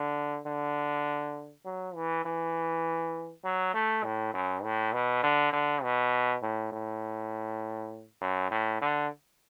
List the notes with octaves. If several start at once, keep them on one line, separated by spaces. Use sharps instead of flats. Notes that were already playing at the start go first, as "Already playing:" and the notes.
Already playing: D3
D3
F#3
E3
E3
F#3
A3
A2
F#2
A2
B2
D3
D3
B2
A2
A2
F#2
A2
D3